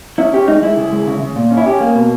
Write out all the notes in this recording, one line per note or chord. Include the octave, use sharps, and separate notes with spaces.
C#4 E4
C#4 G4
G#3 D#4
G#3 E4
C#3
G#3
C#3
C#3
A#2
C#4
E4
C#4 G4
A#3
B2